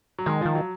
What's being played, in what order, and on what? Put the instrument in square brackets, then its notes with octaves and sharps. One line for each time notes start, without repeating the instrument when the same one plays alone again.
[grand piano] F#3
[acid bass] D#3 [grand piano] G#3
[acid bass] D#3 [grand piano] F3
[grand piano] F#3